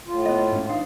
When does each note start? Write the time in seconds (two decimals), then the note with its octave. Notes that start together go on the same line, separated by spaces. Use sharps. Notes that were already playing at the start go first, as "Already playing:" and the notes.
0.07 A2 F4
0.26 B3 D#5
0.52 G#2 C#4
0.69 E3 D4 D#4 F5